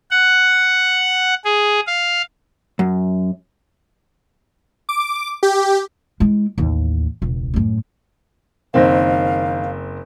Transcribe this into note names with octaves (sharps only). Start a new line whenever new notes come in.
F#5
G#4
F5
F#2
D6
G4
G#3 E4
A1 D#2
E1 C#2
F#2 A2
F#1 D#3 C4 C5 F5 A#6